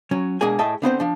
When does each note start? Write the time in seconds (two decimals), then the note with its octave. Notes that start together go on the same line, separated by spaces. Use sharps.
0.11 F#3 C#4
0.41 B2 G#3 A#3 D4 G#4 G#5
0.59 A2 G#4 D#5 E5 G5 A5
0.82 D3 B3 C4 C5
1.00 F3 D4